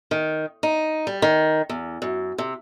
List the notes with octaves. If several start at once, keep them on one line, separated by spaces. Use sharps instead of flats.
D#3
D#4
G3
D#3
E2
F#2
C3